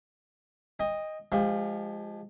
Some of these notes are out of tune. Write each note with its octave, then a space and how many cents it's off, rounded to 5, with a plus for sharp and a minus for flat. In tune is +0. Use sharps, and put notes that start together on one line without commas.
D#5 +0 G5 +40
F3 +0 G#3 +0 G4 +35